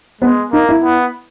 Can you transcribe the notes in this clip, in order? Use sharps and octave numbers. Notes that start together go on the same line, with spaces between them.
G#3 B3
A#3 D#4
E4
B3